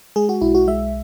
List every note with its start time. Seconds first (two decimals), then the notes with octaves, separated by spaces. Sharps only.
0.16 G#3 G#4
0.29 F#4
0.41 B1 E4
0.55 F#4
0.68 G#3 E5